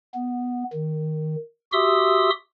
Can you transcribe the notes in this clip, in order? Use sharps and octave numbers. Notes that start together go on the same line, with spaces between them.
B3
D#3
F#4 G4 E5 C6 D#6 E6